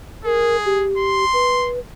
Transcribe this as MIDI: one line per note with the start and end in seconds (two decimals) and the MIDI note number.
0.25 0.85 68
0.25 0.56 70
0.65 1.24 67
0.98 1.69 84
1.33 1.79 71